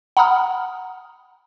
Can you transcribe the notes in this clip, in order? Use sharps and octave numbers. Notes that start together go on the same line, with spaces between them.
F#5 A#5 B5 D#6 F6